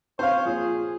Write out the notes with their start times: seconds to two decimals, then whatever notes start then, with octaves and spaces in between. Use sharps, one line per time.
0.19 C4 C5 C#5 F5
0.45 A#2 F3 G#4